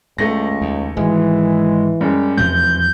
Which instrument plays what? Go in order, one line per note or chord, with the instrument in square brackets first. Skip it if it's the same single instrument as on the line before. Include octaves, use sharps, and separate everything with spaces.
[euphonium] C#2 [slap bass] G2 [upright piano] A3 A#6
[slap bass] D#2
[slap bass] G#1 [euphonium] E3 [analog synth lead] G#3
[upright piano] F#2 G#3 [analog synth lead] G3
[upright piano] F1 [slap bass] E2 F3 F#3 [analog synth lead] G6